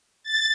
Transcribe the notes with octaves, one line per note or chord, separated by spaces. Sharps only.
A6